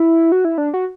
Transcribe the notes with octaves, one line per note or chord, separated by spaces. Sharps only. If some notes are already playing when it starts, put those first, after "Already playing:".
Already playing: E4
F#4
E4
D4
F#4